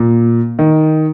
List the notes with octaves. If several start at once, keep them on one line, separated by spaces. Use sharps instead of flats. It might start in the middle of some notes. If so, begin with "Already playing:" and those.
Already playing: A#2
D#3